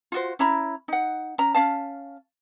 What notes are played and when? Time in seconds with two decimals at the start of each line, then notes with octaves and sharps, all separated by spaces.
0.12 F4 F#4 C5
0.39 C#4 E4 A#5 B5
0.88 D#4 F#5
1.38 C#4 A#5
1.55 C#4 F5 A5